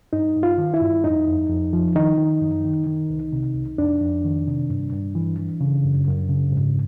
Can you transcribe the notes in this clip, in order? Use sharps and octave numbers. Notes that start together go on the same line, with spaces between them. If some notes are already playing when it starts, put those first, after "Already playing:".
G2 D#4
G2
F4
D#3
E4
G2
F2 D#4
F2
F2
F3
D#3 D#4
D#3
F#2
D#3
D#3
C2
C3
C2
F2 D4
F2
D#3
C3
G2
G2
E3
E3
C#3
F#2
F#2
C#3
G#2